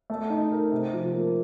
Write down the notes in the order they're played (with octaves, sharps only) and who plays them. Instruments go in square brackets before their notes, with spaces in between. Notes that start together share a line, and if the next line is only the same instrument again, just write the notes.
[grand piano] A3
D#4
A#4
C3
F3
A#3